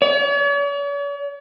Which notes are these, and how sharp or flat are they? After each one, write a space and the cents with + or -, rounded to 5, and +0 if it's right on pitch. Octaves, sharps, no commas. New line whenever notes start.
C#5 +45